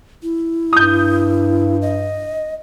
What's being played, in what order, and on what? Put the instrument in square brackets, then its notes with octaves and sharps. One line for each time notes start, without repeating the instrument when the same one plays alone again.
[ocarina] E4
[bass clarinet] G2 [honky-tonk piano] D#6 G6
[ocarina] D#5